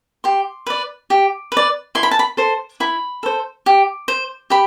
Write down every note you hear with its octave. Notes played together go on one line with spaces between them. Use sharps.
G4 C6
B4 D5
G4
B4 D5
E4 C6
B5
A5
B5
A4 C5 C6
E4 B5
A4 C5
G4
C5
G4 B5